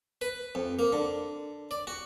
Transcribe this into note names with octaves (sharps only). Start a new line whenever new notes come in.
B4
F2
A#3
D3
D5
F#4